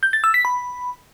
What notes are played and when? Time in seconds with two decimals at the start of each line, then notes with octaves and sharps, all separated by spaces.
0.03 G6
0.13 A6
0.24 E6
0.34 B6
0.45 B5